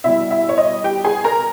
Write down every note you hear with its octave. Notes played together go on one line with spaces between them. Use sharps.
B2 G3 E4 E5
E4 E5
C#5
D#5
G4 G5
G#4 G#5
A#4 A#5